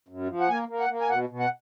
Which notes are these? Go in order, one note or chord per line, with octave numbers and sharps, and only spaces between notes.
F#2
F3
F#5
A#3 G#5
A#3
F#5
A#3
G#5
B2 F#5
B2
F#5